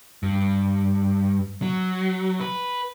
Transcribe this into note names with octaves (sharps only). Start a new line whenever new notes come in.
G2
F#3
B4